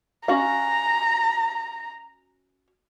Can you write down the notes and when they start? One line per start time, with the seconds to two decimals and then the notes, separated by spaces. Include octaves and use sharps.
0.28 C#4 F#4 F5 A#5